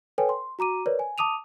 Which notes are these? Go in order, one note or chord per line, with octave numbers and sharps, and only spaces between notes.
A4 B4 C#5 G5 G#5
C6
F#4 A#5 D6 D#7
A#4 B4 C#5 D5
G#5
A5 D6 D#6 D#7 F7